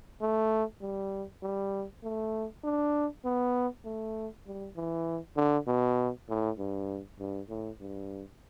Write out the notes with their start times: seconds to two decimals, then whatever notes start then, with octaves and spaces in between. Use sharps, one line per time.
0.21 A3
0.82 G3
1.42 G3
2.03 A3
2.64 D4
3.25 B3
3.85 A3
4.47 G3
4.76 E3
5.37 D3
5.67 B2
6.29 A2
6.58 G2
7.19 G2
7.49 A2
7.80 G2